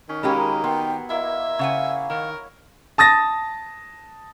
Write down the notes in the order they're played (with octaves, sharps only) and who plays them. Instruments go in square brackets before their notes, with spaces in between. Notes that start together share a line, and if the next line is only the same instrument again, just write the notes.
[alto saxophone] D#3 [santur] C#4
[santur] F#3 A#3 [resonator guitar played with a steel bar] G#3 C#4 G4 [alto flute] B5
[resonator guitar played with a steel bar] B3 [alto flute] G5 [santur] C6
[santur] A#3 E4 [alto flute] D#5 [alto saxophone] E5
[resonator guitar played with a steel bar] C#3 F#5 G#5 [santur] C#5 [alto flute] F5
[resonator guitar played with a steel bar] D#3 [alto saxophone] A#4
[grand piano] A5 D#6 A6 A#6